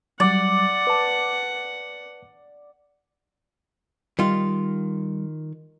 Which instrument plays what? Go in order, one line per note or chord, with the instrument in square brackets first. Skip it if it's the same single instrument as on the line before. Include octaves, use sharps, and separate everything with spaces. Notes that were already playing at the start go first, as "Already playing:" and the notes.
[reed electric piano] F#3 G3 [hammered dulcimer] D5 [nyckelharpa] F#5
[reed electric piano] B4 A5
[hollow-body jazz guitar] D#3 F4 [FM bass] G3